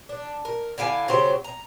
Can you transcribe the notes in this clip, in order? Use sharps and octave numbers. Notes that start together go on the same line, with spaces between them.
D4
A#4
D3 E4 F5 G#5
C#3 F#3 G4 C5
A#5